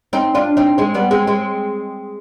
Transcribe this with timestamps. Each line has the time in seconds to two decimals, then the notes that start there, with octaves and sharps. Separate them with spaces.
0.13 C4 D#4
0.35 D4 F4
0.57 C4 D#4
0.78 G#3 C4
0.94 G3 B3
1.11 G#3 C4
1.27 G#3 C4